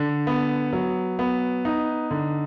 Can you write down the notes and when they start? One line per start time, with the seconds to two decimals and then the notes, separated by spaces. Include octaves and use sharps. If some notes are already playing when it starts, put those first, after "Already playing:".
Already playing: D3
0.27 B3
0.73 F#3
1.19 B3
1.65 D#4
2.11 D3